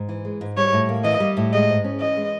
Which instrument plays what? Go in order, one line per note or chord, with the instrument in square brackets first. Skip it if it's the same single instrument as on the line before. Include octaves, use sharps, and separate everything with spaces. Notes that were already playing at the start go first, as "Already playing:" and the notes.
Already playing: [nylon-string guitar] G#2
E3
G#3
G#2
[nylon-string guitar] G3 [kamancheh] C#5
[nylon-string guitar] A2
A#3
[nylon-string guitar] E3 [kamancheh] D#5
[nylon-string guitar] G3
A2
[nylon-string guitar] G#3 [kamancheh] D#5
[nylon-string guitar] G#2
C#4
[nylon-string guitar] E3 [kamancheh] D#5
[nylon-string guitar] G#3